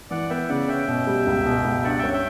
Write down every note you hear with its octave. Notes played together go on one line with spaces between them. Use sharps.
E3 D5 F#5
B3 E5 G5
C#3 D5 F#5
C#4 E5 G5
B2
G3
C#2
B2
C#2
G2 D5 F#5
C#4 E5 G5
E5 G5